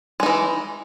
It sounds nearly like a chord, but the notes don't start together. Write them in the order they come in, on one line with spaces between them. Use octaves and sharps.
G#3 D#4 E3